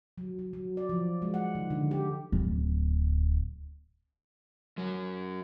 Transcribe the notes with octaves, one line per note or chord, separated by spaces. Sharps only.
F#3
F#3
F#3
D5
F3
G#3
F#5
D#3
D3
G4
D1
F#2 F#3